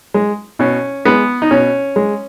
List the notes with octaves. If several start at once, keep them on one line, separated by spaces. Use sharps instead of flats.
G#3
B2 C#4
G#3 B3
D#4
B2 C#4
G#3